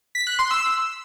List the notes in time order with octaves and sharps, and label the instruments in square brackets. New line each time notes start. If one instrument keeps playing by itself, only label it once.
[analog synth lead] B6
F#6
C6
E6